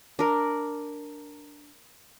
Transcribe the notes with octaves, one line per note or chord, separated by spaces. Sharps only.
D4 A#4